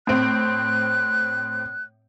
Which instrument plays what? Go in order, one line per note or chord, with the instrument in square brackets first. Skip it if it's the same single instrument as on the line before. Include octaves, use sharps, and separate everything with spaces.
[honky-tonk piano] A2 C4 [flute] F#6